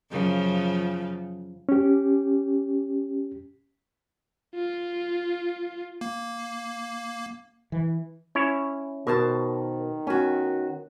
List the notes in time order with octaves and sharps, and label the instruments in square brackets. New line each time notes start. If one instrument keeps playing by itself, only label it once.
[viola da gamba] F#2 C#3 F3
[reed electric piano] C#4 G4
[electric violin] F4
[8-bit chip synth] A#3
[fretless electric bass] E3
[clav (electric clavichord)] C#4 E4 C#5
[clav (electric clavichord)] B2 [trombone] D#3 [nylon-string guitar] A#4 C5 A5
[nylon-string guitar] B3 F#4 [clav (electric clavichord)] C#4